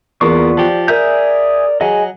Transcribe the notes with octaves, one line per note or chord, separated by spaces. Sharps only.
E2 A#3 B3 F4 D5 C#6
F3 G4
G#4 A#4 D5 E5 G6
F#3 G#4 D#5 G#5